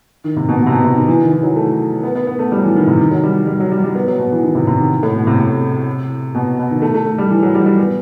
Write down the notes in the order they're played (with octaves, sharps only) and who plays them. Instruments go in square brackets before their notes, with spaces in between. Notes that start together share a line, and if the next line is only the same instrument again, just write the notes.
[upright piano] D#3
C3
B2
B2
C3
B2
C3
D#3
E3
D#3
E3
F#3
A3
B3
B3
B3
A3
G3
F#3
E3
D#3
C3
D#3
F#3
G3
G3
F#3
G3
G3
B3
F#3
B2
E3
D#3
C3
C3
D#3
A2
B2
C3
C3
B2
B2
D#3
A3
A3
A3
G3
E3
F#3
G3
G3
B3